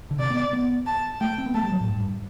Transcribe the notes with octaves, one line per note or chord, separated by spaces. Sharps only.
D3
C3 D5
B3
B3
A5
A3 G5
C4
B3
A3 A5
G3
F#3
A2
G2
G2